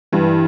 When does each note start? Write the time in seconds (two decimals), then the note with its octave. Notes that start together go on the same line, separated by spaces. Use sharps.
0.12 G2 E3